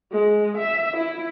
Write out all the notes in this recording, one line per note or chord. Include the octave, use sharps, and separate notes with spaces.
G#3
E5
E4